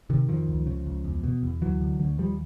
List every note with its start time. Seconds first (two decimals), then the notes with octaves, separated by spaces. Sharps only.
0.10 C3 D#3
0.28 F2 D#3 F3
0.48 C#2
0.66 C#3
0.86 C#2
1.04 E2
1.23 B2
1.43 E2
1.61 D2 E3 F#3
1.80 D3
1.99 D2
2.18 D#2 F3 G3